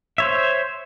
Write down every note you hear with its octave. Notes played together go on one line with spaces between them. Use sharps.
C5 C#5 E5